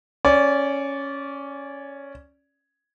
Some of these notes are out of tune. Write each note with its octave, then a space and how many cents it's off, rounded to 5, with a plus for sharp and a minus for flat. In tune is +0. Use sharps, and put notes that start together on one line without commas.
C#4 +0 D5 -20